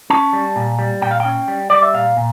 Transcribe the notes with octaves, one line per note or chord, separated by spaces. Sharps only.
C#4 A5
G3
A#2
G3
A#2 G5
F5
C#4 G5
G3
G3 D5
E5
A#2 F5
A#2